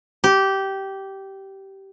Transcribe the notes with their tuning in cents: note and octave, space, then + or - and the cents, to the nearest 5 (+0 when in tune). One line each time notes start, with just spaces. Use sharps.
G4 -15